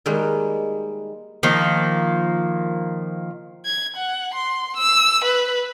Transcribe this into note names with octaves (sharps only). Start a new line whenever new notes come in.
D#3 G3 G#3 A#3
D#3 F3 A#3
G#6
F#5
C6
E6
B4